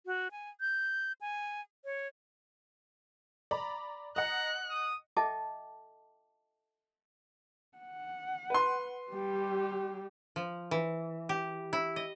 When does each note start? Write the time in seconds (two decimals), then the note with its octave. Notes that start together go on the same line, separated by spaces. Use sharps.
0.06 F#4
0.31 G#5
0.61 G6
1.21 G#5
1.85 C#5
3.51 D5 A#5 B5
4.16 D#5 F#5 A#5 F#6
4.70 D#6
5.17 A4 D#5 E5 G5 A5 D6
7.78 F#5
8.50 B4 C6
9.11 G3 G4
10.36 F3
10.71 E3
11.29 G4
11.73 E4
11.96 D#5